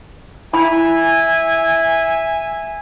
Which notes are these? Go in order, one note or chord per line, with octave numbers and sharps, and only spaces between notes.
E4 E5 G#5 B5